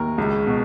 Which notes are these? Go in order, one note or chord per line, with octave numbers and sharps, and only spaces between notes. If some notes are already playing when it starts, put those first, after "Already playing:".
Already playing: D#2 A#4
C#2
B2